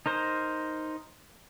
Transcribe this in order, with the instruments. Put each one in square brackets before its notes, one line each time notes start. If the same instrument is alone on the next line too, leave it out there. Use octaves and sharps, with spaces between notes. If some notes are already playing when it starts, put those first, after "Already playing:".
[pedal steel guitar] D#4 A#4 C5